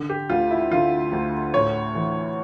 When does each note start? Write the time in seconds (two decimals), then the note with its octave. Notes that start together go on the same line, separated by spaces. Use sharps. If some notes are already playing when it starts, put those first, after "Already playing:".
Already playing: D3
0.09 G4
0.29 D2 F4
0.51 E4
0.71 D3 F4
1.12 D2
1.54 A2 C#5
1.95 E3